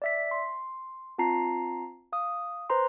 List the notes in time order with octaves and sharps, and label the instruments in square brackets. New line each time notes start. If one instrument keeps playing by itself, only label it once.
[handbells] D5 E5 B6
C6
C4 F4 A5 A#5 C7
F5 D#6
B4 C5 A#5 C6